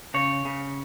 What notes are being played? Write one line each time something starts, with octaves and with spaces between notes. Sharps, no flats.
C#3 C#5
C#3